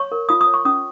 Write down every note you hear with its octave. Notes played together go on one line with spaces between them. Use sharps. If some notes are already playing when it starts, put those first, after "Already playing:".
Already playing: C#5 C#6
A#4
F4 D#6
D#6
C#5
C#6
C#4 D#6